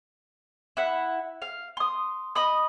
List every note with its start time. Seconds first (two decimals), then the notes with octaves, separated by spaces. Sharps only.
0.77 E4 F#5
1.42 F5
1.77 C6 D#6
2.35 D#5 B5 D#6